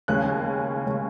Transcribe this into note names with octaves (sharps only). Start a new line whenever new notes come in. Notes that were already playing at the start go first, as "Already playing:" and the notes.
D#2 C#3 G#3 C#4 F#6
C#3 G#3 C#4